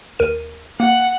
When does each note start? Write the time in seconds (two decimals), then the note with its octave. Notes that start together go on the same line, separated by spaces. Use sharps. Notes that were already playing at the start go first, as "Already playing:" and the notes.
0.19 D#2 A#4 D#7
0.80 A#3 F#5